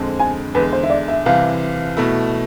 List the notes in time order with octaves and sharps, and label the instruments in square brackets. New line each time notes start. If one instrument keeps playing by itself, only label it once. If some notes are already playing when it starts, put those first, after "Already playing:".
Already playing: [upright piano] F2 D3 G#3 C4
[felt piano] G#5
[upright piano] E2 D3 G#3 [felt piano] B4
[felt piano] C5
E5
D5
E5
[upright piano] C2 C3 E3 [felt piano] F5
[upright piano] B2 A3 E4